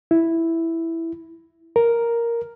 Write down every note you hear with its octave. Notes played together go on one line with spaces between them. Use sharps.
E4
A#4